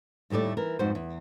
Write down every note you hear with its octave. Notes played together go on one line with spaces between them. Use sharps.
D#2 A2 G3 A3 D5
E3 A#4
F2 G#2 G3 F#4 C5
E2